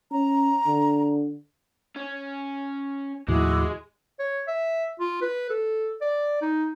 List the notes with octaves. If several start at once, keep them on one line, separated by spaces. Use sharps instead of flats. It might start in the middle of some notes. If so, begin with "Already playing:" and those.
C#4 A#5
D3
C#4
D#2 A2 F3 G#3 E4 F#4 D6
C#5
E5
F4
B4
A4
D5
D#4